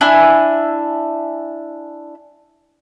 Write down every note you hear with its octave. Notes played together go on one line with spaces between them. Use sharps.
D4 E4 G#5